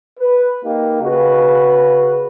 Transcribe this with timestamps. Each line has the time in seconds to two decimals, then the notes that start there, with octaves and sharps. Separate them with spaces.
0.18 B4
0.64 A#3 D#4 G4
1.03 C#3 F#4 B4